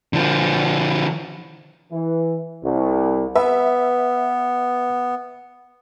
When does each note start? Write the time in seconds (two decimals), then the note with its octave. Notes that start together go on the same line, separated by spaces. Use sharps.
0.13 D3 F3
1.91 E3
2.63 C2
3.35 B3 B4 E5